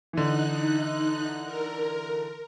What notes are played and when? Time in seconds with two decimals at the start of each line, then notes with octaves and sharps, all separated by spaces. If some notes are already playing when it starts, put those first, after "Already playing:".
0.13 D3 E3 D#4 F#6
1.45 A#4